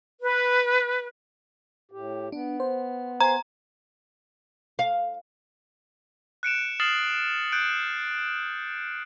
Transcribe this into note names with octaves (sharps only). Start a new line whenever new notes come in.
B4
A2 G4
B3 D4
C5
C5 G#5 A#5 C6
F5
F#6 C#7 D7 E7
D#6 F6 A6 C7 E7 F#7
F#6 G6 D7